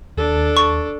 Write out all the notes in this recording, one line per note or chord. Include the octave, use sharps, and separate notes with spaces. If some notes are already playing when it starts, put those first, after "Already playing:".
D#2 D4 A4
C#6